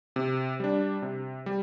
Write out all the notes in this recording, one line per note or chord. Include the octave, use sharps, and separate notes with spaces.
C3
G3 D4
C3
G3